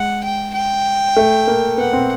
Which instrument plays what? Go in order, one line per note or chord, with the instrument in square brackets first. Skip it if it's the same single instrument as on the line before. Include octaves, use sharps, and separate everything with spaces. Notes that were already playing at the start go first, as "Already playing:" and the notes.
Already playing: [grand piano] G#3 [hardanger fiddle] F#5
[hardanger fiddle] G5
G5
[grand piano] A3
A#3
[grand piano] B3 [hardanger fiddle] F#5
[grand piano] C4